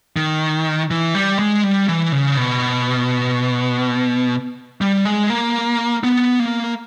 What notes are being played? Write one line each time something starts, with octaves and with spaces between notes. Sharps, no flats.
D#3
E3
G3
G#3
G3
E3
C#3
B2
G3
G#3
A#3
B3
A#3